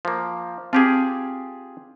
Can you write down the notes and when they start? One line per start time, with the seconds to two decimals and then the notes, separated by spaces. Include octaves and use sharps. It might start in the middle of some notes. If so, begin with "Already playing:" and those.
0.05 F3 A#3
0.73 C4 F4 G4 G#4